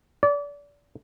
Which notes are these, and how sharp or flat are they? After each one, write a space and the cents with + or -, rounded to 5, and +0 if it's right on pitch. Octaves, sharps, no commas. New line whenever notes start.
D5 -30